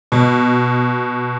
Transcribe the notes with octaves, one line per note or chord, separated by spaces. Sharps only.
B2